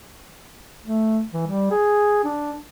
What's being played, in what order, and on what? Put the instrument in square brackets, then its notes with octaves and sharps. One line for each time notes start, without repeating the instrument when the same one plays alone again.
[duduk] A3
E3
G3
G#4
D4